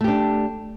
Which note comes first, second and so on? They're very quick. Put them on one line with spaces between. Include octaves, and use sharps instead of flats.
A3 G4 D4